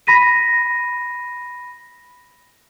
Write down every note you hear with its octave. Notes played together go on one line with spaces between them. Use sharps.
B5 A#6 B6 D#7